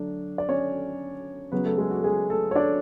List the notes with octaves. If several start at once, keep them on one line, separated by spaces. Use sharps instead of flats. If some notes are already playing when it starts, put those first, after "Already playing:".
Already playing: D3 F#3 A3 D4
D5
C#4 C#5
C#3 F#3 B3 B4
A3 A4
G#3 G#4
F#4
G#3 G#4
A3 A4
C#5
D4 D5